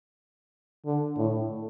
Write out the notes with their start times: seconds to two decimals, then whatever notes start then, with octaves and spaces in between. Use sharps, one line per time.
0.86 D3
1.18 A2